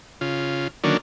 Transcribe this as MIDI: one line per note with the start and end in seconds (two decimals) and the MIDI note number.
0.21 0.68 49
0.21 0.68 65
0.84 0.97 50
0.84 0.97 51
0.84 0.97 54
0.84 0.97 58
0.84 0.97 61
0.84 0.97 62